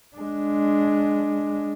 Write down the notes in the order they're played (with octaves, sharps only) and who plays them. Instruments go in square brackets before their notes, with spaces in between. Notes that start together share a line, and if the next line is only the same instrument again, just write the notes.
[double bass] G#3 D4